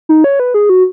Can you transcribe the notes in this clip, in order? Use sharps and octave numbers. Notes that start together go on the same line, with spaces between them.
D#4
C#5
B4
G#4
F#4